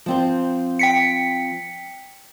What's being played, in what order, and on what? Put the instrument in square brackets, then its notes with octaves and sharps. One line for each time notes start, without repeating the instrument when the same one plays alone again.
[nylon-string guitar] F3 C4 C5
[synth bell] G5 B6 C#7